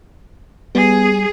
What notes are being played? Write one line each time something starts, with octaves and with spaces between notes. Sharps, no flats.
G3 B3 G#4